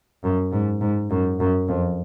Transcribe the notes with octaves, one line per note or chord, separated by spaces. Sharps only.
F#2
G#2
G#2
F#2
F#2
F2